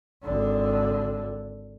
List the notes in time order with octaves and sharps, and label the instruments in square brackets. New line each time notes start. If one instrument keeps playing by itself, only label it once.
[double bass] G#1 D3